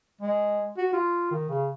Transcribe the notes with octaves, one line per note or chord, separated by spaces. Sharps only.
G#3
F#4
F4
D#3
C#3